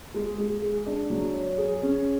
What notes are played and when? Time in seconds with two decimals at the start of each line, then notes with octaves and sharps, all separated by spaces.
0.14 G#3
0.38 G#3
0.62 G#4
0.86 D4
1.10 F#3
1.34 C#5
1.58 G#4
1.82 C#4